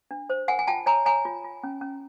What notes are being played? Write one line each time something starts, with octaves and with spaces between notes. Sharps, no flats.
D4
C5
A#4 F#5 G#5
G#5
F4 G5 A5
C#5 G#5 A#5
C#5 G#5 A#5
F4
F4
C#4
C#4